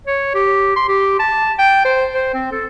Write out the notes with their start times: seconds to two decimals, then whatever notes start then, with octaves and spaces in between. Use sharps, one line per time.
0.07 C#5
0.35 G4
0.76 C6
0.88 G4
1.19 A5
1.59 G5
1.85 C5
2.14 C5
2.34 C4
2.52 A4